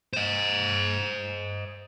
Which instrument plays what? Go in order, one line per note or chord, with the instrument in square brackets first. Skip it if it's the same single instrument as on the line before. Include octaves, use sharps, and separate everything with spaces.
[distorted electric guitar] C5 D#5